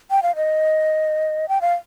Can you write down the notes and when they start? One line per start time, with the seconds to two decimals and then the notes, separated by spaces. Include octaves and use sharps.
0.11 G5
0.23 F5
0.36 D#5
1.49 G5
1.62 F5